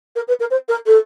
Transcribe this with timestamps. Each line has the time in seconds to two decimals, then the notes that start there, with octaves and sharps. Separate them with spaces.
0.15 A#4
0.28 B4
0.40 A#4
0.50 C5
0.68 A#4
0.86 A4